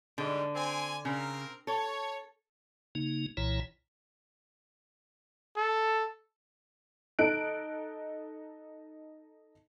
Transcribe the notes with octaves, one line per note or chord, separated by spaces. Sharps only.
G#2 D3 G3
C4 G#5
C#3 C4 A#4
A4 C#5
C#3 A#3 D#4
C2 A#2 E3 E4 C#5 A#5
A4
D#4 A4 F#6 D7